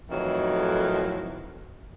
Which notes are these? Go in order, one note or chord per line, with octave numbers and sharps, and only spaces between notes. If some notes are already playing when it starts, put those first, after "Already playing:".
F2 A2 D#3 E3 F#3